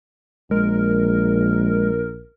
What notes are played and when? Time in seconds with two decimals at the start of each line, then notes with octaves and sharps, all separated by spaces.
0.51 A#1 G#3 A#4